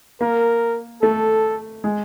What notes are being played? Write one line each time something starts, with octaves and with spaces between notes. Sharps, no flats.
A#3 A#4
A3 A4
G#3